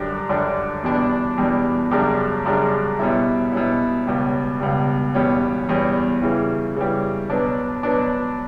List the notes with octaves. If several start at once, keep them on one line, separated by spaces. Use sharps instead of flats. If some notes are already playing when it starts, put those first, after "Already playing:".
Already playing: F#2 D3 G3 D4
F#2 D3 G3 D4
E2 B2 G3 D4
E2 B2 G3 D4
F#2 C#3 G3 D4
F#2 C#3 G3 D4
B2 G3 C#4 E4
B2 G3 C#4 E4
C#2 B2 G3
C#2 B2 G3
E2 B2 G3 C#4
E2 B2 G3 C#4
C#3 E3 G3
C#3 E3 G3
B2 F#3 B3 D4
B2 F#3 B3 D4